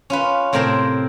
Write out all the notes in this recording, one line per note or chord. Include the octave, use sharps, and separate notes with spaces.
C#4 F4 B4
A2 C3 C4 A#4 C5 A5